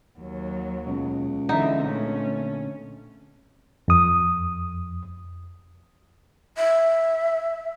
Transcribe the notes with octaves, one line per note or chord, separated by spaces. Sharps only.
D#2 F#3
C#2 B2
D3 E3 D#4 E5 F#5
A#2 D3 A3 C4 C#4
F2 D#6
E5